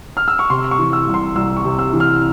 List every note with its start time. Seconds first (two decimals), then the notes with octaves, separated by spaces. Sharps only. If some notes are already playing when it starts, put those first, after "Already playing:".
0.17 F6
0.28 E6
0.39 C#6
0.50 C3 C6
0.71 C#6
0.79 E3
0.93 E6
1.07 C2
1.14 C6
1.35 C2 E6
1.57 C#6
1.64 C3
1.79 E6
1.93 E3
2.00 F6